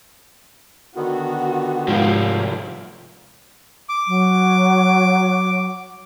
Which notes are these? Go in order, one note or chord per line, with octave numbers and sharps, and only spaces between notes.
D3 D#3 B3 F#4
C2 G#2 F3 F5
D6
F#3